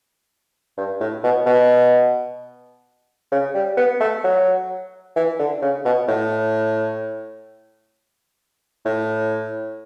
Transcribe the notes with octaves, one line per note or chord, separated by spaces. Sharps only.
G2
A2
B2
B2
C#3
G3
B3
A3
F#3
E3
D3
C#3
B2
A2
A2